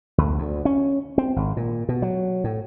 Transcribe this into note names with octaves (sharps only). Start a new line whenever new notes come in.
D2
D2
C#4
C4
G#1
A#2
B2
F#3
A2